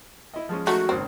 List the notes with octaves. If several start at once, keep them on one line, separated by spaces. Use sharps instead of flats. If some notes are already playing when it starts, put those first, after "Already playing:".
E4 D#5
F3 G#3 C#4
D#3 F#3 A3 F#4
G#1 C#2 C4 A#4